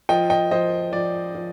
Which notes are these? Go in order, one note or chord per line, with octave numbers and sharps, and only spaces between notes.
F3 D#5 G5
D#5 G5
F3 C5 D#5
F3 D5
F3